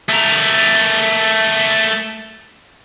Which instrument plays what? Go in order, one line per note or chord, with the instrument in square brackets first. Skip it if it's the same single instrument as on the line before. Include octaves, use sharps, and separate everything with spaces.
[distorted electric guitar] A3 A#4